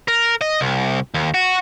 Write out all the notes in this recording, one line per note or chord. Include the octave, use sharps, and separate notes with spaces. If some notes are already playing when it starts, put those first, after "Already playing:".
A#4
D#5
C2
D#2
F#4